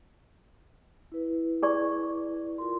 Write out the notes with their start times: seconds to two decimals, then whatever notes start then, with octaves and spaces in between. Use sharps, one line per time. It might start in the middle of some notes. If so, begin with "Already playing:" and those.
1.12 E4 B4
1.63 G#4 D5 C#6
2.58 F4 A#4 C6